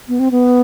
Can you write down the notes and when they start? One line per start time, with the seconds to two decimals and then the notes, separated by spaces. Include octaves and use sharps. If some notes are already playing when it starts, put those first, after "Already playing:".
0.08 B3
0.19 C4
0.31 B3